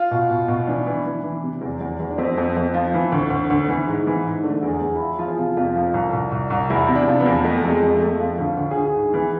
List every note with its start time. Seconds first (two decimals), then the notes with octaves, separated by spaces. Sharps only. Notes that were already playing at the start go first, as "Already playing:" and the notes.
Already playing: F4
0.11 B2
0.31 B2
0.48 B2
0.67 E3 D4
0.86 E3
1.06 E3
1.24 E3
1.43 C3
1.61 E2
1.81 E2
2.00 E2
2.10 D4
2.18 F2 C4
2.38 F2
2.56 F2
2.74 F3
2.94 E3
3.12 D2
3.30 D2
3.50 D2
3.68 E3
3.87 G#2
4.07 E3
4.25 G#2
4.43 D3 A3
4.63 E2
4.68 G#4
4.82 E2
4.95 E4
5.01 F3
5.19 F3 F4
5.28 G#4
5.38 C3 F4
5.57 F2 F4
5.76 F3
5.94 C2
6.13 C2
6.32 C2
6.50 C2
6.70 E2 E4
6.89 C3
6.95 D4
7.08 F3
7.19 B3
7.26 E2
7.44 F2 A3
7.64 F2
7.69 G#3
7.83 F2
7.96 A3
8.02 F2
8.20 F3
8.39 D2
8.46 F4
8.57 D2
8.71 G#4
8.76 D2
8.85 G#4
8.95 G#2
9.14 E3